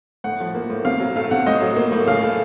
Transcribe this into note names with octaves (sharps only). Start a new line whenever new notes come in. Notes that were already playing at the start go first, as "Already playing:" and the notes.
A2 F#5
F3
A#3
A2
C3 F5
F#3
A3 F5
C3 F#5
A2 D#5
F#3
A#3
A2
C#3 F5
A3